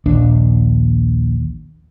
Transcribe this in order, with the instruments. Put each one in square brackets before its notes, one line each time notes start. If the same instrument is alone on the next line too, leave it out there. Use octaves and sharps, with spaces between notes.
[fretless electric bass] A#1 D#2 D4